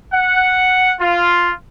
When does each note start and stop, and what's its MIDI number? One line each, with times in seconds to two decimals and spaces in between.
0.12 0.93 78
1.00 1.51 65